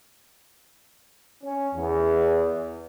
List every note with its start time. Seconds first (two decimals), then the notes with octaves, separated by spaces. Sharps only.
1.44 C#4
1.74 E2